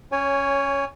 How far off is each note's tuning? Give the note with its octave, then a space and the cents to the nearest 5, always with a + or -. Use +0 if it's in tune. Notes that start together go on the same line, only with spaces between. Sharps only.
C#4 -5 C#5 +10 G#5 -15